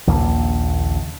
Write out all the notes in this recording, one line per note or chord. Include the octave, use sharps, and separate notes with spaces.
A#1 D#2 C#3 A#3